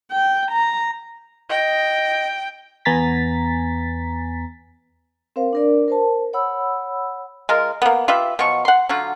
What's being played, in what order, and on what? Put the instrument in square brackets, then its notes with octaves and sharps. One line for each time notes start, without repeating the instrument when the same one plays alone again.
[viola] G5
A#5
[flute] D#5 [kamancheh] G5
[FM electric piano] E2 B3 G#5 A#5 A6 B6
[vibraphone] C4 A#4 C5 F5
D4 A#4 D5
A#4 C5 A5
C#5 F#5 B5 E6
[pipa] G#3 F4 A#4
A#3 B3
F4 G4 B4 E5
B2 F3 F#3 C#6
F#5 C6
D3 F#3 F4 F#4